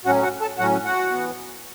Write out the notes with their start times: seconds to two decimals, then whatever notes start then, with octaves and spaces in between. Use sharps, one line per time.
0.05 A2 F#3 C#4 F#4 F#5
0.23 F#4 F#5
0.41 A4 A5
0.59 A2 F#3 C#4 F#4 F#5
0.85 F#4 F#5
1.12 E3 B3